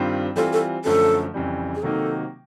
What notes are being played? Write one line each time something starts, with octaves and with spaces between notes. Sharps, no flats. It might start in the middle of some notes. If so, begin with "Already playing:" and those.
Already playing: G2 D#3 G3 C4 F4
E3 G3 C4 F4 A4
A4
F#2 D3 F3 A3 C#4 A4
F2 C#3 E3 G3
G#4
C3 D#3 F#3 A#3 D#4 A4